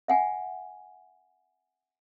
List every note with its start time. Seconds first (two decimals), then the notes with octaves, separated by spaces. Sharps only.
0.08 E5 F#5 G#5